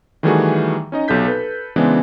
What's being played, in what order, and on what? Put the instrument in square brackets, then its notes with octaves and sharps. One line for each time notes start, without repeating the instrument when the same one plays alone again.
[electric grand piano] D#3 E3 G3 A3 F#4 G#4
C#4 D#4 D#5
B1 C3 A4 G6 B6
A4 B4
C#3 E3 G#3 B3 C4 D4